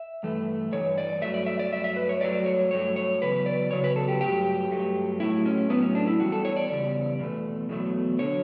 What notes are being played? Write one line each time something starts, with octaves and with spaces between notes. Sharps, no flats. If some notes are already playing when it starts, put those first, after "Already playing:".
Already playing: E5
G2 E3 A3
G2 E3 C#5
D5
G2 F#3 A3 E5
D5
E5
D5
G2 F#3 A3 E5
E5
B4
C#5
G2 F#3 A3 D5
C#5
G2 F#3 A3 C#5
C#5
E2 C#3 F#3 B4
D5
E2 C#3 F#3 C#5
B4
A4
G4
G2 F#3 A3 G4
G2 F#3 A3
A2 F#3 A3 E4
C#4
A2 F#3 A3 B3
C#4
D4
E4
E2 C#3 G3 F#4
A4
C#5
D5
E2 C#3 G3
E2 B2 A3
E2 B2 F#3 A3
D3 F#3 C#5